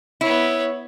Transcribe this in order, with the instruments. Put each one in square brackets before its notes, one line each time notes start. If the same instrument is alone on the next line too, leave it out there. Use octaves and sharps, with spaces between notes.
[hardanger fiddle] B3 C#5 [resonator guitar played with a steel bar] E4